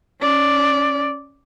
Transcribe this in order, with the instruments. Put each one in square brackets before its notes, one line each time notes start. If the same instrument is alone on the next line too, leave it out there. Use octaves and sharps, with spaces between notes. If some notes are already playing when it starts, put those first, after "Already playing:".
[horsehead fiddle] C#4 D5